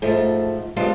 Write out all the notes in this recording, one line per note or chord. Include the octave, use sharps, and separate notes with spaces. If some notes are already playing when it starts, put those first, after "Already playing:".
G#2 F3 A3
G3 G#3 B3 C4 D4 F4